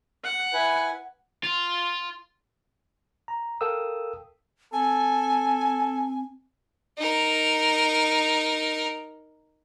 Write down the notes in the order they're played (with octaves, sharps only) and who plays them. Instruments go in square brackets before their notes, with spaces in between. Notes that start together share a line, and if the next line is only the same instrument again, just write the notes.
[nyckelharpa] F#5
[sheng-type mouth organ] E4 B4 G#5
[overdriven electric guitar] F4
[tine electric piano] A#5
A4 A#4 F5 G5 D#6 E6
[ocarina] C4 [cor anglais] A4 [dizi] G#5
[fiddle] D#4 A#4